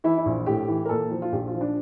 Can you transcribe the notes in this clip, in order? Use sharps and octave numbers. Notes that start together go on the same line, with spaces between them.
E3 E4
E4
A#1
A2 G4
E3
A#4
A#2 A4
F3
F4
A#1 G4
F4
F3
D4